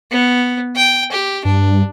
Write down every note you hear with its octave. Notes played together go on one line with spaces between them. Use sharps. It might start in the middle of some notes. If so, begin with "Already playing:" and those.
B3
G5
G4
G2 D4